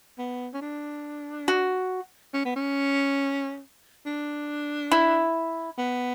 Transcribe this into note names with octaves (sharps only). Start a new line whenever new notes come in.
B3
C#4
D4
F#4
C#4
B3
C#4
D4
E4
B3